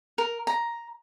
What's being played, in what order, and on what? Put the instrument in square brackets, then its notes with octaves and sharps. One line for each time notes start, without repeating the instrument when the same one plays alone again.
[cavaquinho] A#4
A#5